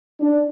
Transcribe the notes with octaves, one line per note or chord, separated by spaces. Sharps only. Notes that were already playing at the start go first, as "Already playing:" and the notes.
D4